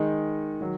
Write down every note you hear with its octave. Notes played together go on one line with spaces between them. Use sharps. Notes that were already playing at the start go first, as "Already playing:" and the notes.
Already playing: D#3 G#3 D#4
D#3 F#3